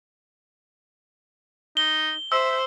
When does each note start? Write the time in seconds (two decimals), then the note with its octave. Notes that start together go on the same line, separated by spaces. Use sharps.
1.77 D#4 G7
2.32 C5 E5 E6